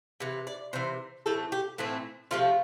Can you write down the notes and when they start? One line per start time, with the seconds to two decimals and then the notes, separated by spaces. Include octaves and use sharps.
0.20 C3 E3
0.47 D5
0.73 C3 E3 C5
1.26 A2 E3 A3 C4 A4
1.52 G4
1.78 A2 E3 A3 C4
2.31 C3 F3 A3 F4